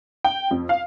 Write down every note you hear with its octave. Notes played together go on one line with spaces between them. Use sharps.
G5
F2
F5